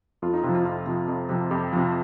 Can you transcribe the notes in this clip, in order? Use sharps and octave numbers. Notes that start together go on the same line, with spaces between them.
F2 F4
D#4
C3 F4
F3
F4
F2 F4
C3 F3
F2
C3 F3
F2 G4
C3 F3